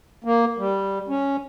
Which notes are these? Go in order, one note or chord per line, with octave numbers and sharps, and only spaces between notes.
A#3
G3
C#4